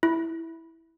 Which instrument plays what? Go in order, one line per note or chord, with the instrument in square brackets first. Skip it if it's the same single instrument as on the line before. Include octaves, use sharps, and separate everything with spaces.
[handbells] E4